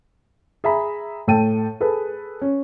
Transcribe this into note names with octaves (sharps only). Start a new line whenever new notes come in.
G#4 E5 A#5 B5
A2 A3 A4 G5 A5 D#7
G#4 A4 B4
C#4